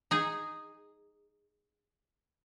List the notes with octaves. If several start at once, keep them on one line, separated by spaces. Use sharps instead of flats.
D#4 G#4